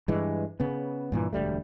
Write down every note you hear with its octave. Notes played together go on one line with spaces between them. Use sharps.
G2 E3 G#3
C#3 B3
G2 A#2 E3
E1 D2 G3 A3